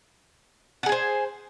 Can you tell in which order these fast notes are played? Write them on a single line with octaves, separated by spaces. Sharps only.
F#5 G#4 G#5 C5